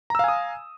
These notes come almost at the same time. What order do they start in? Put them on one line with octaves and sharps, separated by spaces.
A#5 E6 F5 G#5 D#6